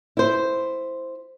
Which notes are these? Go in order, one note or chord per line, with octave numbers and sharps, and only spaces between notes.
E4 C5